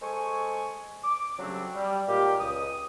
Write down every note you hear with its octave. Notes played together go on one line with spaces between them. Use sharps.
G#3 A4 C5 G#5 C#6
D6
C#3 F#3 G3 A3 C4 D4
G3
A#2 G#3 A#3 G4
C#2 D#6